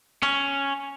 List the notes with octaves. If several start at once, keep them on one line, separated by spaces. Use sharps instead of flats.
C#4